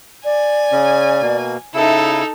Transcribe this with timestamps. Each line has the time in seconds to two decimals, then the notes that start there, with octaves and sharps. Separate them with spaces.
0.25 D5 G#5
0.72 C#3 C#4
1.22 B2 A#3
1.74 C#3 D#4 E4 A4 E5